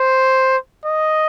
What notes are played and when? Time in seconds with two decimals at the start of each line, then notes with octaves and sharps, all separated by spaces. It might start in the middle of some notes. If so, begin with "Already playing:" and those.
Already playing: C5
0.85 D#5